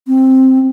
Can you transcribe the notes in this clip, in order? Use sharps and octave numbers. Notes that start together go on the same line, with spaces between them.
C4